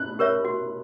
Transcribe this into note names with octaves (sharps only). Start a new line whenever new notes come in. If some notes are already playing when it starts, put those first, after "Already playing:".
Already playing: F#6
G4 A#4 C#5 E5
F#4